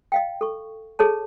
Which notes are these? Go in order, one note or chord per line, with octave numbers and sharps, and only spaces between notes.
D#5 F5 G5
A4 C#6
G#4 A4 C#5 A5